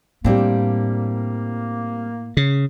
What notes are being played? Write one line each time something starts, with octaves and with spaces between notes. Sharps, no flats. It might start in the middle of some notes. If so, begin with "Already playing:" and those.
A2 G3 A#3 C4 D4
C#3